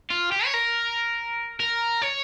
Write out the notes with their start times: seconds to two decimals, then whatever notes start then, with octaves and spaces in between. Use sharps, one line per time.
0.10 F4
0.31 G4
0.45 C#5
0.54 A#4
1.60 A#4
2.02 C#5